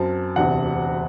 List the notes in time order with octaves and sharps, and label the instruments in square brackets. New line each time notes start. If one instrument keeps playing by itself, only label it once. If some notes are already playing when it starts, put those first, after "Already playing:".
Already playing: [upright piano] F#2 F#3 C4 A5
E1 D2 C3 F#5